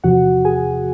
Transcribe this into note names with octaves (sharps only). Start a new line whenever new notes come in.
E2 C3 F3 F#4 F#5
G#4 G#5